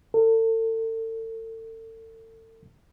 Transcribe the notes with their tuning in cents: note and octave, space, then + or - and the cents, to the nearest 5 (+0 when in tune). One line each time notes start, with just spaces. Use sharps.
A4 +35